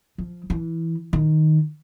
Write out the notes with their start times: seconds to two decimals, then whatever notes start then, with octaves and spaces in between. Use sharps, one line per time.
0.18 F3
0.50 E3
1.13 D#3